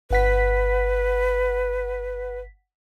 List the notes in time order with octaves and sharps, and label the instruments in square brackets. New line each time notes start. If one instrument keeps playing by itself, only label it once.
[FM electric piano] G1 F#5 B6 [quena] B4